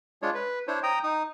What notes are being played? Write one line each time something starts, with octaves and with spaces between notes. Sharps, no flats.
G#3 D4 F4 C#5
B4
D4 E4 C5 C#5
G5 A#5 D#6
D#4 D#6